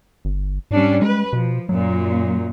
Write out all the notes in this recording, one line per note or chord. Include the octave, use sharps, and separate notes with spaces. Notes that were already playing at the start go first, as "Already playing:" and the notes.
G1
G#2 G3 C#4 D4
G#3 B4
B2 F3
F#2 A#2 F#3